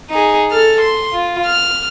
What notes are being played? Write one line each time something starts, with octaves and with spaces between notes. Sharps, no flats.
D#4 G#4
A4 F6
C6
F4
F6